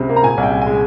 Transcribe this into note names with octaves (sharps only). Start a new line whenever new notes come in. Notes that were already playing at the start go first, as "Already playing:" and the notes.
Already playing: C#2 C3
A#3
A#5
A#2 G#5
C2
G5
C2
G#3 G#5